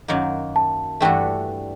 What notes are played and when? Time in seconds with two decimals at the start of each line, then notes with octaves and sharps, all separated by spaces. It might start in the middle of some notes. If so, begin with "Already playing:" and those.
0.08 F#2 D#3 F#3 A#3
0.56 A5
1.00 G2 E3 A3 D4 F#4 G5